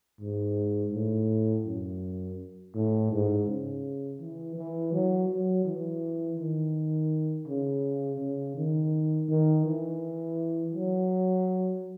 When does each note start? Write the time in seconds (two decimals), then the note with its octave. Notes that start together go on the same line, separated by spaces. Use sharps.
0.20 G#2
0.93 A2
1.66 F#2
2.75 A2
3.11 G#2
3.47 C#3
4.20 E3
4.56 E3
4.93 F#3
5.29 F#3
5.65 E3
6.38 D#3
7.47 C#3
8.20 C#3
8.56 D#3
9.29 D#3
9.66 E3
10.74 F#3